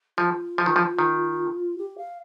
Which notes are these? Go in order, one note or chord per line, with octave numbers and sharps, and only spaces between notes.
F3 F4
F3
D#3
F3
D#3
G4
F5